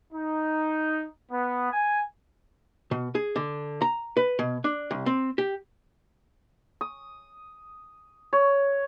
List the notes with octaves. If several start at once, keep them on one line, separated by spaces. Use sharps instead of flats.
D#4
B3
G#5
B2
G#4
D3
A#5
B4
B2
D4
C2
C4
G4
D#6
C#5